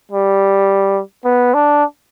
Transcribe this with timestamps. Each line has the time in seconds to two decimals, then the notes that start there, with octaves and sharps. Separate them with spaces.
0.12 G3
1.25 B3
1.54 D4